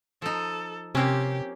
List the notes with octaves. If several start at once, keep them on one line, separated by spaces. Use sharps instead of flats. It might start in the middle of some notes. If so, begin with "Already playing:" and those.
F3 D#4 A4
C3 A#3 C4 C#4 G4